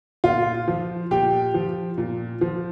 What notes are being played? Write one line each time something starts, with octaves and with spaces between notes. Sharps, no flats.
A#2 F4
F3
A#2 G4
F3
A#2
F3